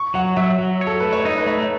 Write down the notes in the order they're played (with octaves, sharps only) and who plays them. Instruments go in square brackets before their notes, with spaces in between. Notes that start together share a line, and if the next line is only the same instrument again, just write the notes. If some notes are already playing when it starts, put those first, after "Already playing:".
Already playing: [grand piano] C#6
[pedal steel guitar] F#3 [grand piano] F#5
[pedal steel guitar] F#3 [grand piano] E5
[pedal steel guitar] F#3
C#5
[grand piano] A4
[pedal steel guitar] A3 [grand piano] B4
[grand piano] C#5
[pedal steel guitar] D#4 [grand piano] D#5
[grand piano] B4
[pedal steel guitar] A3 [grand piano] C#5